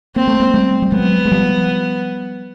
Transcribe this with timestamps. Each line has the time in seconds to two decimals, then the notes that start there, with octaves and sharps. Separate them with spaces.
0.15 A#3 C4
0.27 A3
0.40 G#3 A#3
0.54 G3 A3
0.82 G3
0.92 F#3 G#3 B3
1.25 G#3
1.32 F3 G3